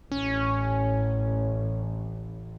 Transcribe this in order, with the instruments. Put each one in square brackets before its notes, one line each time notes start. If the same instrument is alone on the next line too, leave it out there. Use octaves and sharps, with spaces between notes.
[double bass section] A1 [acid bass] C#4